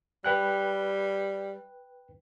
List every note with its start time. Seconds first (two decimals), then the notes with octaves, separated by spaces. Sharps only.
0.24 G3 B4 G5 F#6